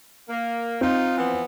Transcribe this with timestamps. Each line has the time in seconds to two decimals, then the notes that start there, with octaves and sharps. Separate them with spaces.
0.29 A#3
0.81 C4 D#4 F4
1.18 E3 F3 B3